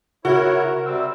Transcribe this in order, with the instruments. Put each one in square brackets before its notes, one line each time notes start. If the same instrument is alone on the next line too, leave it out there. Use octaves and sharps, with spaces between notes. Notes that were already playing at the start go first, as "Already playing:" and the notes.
[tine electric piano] C#3 [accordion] E4 C#5 [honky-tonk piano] F#4 [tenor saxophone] A#4
[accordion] C3 G3 [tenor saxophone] C4 [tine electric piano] E6